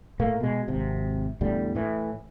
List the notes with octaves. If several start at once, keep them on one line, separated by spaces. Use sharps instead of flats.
A2 A3 A#3
B2 G#3
G#1 C3
E2 A2 D3 G3
A2 E3